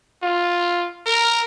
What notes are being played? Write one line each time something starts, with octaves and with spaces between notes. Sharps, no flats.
F4
A#4